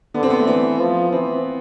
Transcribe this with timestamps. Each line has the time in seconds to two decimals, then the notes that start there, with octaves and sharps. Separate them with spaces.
0.14 D3 B3
0.23 C4
0.30 B3
0.39 A3
0.47 E3 B3
0.80 F3
1.12 E3 C4